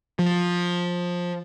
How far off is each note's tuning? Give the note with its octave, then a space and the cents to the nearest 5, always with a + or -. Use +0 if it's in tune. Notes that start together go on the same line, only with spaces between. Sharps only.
F3 +15